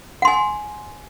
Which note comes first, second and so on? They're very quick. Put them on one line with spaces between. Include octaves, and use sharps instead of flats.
F#5 C6 G#5